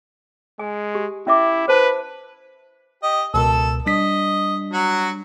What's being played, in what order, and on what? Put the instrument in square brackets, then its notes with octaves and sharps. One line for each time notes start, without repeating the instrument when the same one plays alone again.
[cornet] G#3 [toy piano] G#5
[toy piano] G4
[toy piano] C#4 E5 D6 [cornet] E4
[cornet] B4 [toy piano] C5 A5
[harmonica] G4 D#5
[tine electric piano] C#2 B2 A#4 [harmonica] A4 E6
[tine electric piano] G3 D4 B6 [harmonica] D#5
[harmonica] F#3 F#4